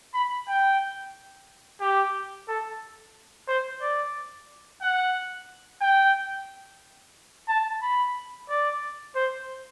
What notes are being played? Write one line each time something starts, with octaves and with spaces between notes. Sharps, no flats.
B5
G5
G4
A4
C5
D5
F#5
G5
A5
B5
D5
C5